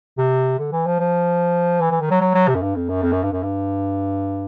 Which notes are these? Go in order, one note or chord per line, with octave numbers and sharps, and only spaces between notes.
C3
D3
E3
F3
F3
E3
E3
D#3
F#3
F#3
F#3
C3
F#2
G2
F2
F#2
F2
F#2
G2
F#2
G2